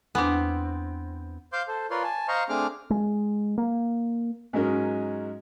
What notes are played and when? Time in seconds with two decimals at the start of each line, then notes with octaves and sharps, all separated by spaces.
0.15 E2 B3 C4 D4
1.53 C5 F5 C6 D6 G6
1.68 A4 C5
1.90 F4 A#4 B4 C#5 D5 C6
2.03 G#5 A5
2.28 C5 D#5 F5 A#5 C6 C#6
2.49 A3 C4 D4 G#4 D6 F6
2.90 G#3
3.58 A#3
4.53 G#2 F#3 G#3 C#4 A#4